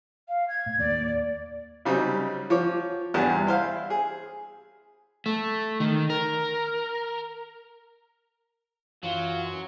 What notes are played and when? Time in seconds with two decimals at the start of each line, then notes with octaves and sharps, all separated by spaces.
0.28 F5
0.48 G#6
0.66 A2
0.79 D#2 D#3 A#3 D5
1.85 C#3 F#3 G3 C4 D#4
2.50 F3 C#5 D6
3.14 E2 G2 D4 G4 G#4 F#5
3.47 E4 C5 F5
3.90 G#4
5.26 A3
5.80 D#3
6.10 A#4
9.03 F#2 E3 F#3 F4